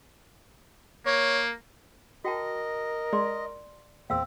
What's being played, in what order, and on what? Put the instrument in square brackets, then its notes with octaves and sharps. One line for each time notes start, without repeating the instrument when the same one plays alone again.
[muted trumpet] A#3 [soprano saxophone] C#5
[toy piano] F#4 G5 A5 [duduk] A#4 [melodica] D#5
[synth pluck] G#3 [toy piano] D5 C6
[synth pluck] E2 A#2 [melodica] C4 [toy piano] F5 E6